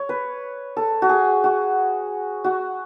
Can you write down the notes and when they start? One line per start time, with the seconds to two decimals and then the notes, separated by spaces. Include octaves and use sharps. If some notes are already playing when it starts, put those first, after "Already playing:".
Already playing: C#5
0.09 B4
0.77 A4
1.02 F#4
1.09 G#4
1.44 F#4
2.44 F#4